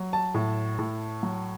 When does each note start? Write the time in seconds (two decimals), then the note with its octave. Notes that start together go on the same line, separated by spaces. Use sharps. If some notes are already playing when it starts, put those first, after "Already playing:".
Already playing: F#3
0.13 A5
0.34 A2
0.79 A2
1.23 F#3